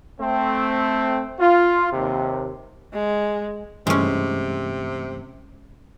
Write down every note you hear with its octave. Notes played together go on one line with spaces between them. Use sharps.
A3 C4
F4
D#2 C3
G#3
G2 C3 E3 G#3 A3 C#4